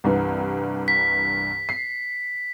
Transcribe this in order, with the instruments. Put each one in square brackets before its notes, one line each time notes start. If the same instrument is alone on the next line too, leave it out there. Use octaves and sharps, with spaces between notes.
[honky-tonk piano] C2 G2 E3
[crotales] B6
[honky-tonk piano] C7